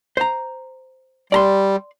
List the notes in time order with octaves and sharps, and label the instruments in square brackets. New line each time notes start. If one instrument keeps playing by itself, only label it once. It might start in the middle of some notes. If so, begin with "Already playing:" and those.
[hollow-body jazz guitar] C5 A#5
[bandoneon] G3 [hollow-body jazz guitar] D5 A#5 C6